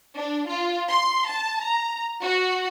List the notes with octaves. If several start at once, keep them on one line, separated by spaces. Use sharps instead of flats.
D4
F4
C6
A5
A#5
F#4